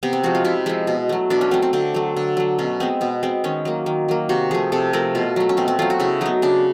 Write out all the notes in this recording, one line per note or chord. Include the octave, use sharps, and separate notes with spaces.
C3 B3
C4
F3 G#3 F#4
F4
C3 E4
F3 G#3 E4
B2
F#3 A3
B2 D4
C#4
F#3 A3 C4
C4
D3 C4
F#3 A3
D3
F#3 A3
B2 C#4
G#3 B3 C4
B2 B3
G#3 B3 C4
D#3 C#4
F#3 A#3
D#3
F#3 A#3
C3 F#4
F3 A3 G#4
C3 A4
F3 A3 A#4
B2 F4
F#3 A3
C#4
B2 C4
C4
F#3 A3 F4
F#4
C#3 E4
F#3 B3 D#4
C#3 D4